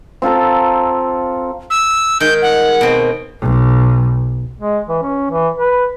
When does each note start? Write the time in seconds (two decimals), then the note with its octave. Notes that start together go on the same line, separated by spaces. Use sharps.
0.22 C4 F4 A4 A#5
1.70 E6
2.20 D#3 G#3 G6
2.42 F#5
2.81 B2 C4
3.41 B1
4.61 G#3
4.89 E3
5.03 C#4
5.32 E3
5.58 B4